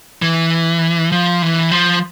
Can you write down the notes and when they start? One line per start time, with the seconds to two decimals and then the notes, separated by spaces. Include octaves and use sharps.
0.22 E3
1.12 F3
1.42 E3
1.72 F3